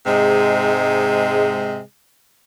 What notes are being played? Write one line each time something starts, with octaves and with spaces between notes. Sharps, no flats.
G#2 C3 G#3